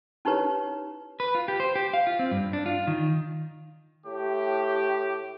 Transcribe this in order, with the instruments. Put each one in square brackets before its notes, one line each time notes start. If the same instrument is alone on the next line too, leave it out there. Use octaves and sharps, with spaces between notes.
[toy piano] C#4 D#4 E4 G4 B4 C#5
[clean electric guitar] B4
F4
G4
C5
G4
F5
F4
C4
G2
D4
F4
D#3
[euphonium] A2 [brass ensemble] G4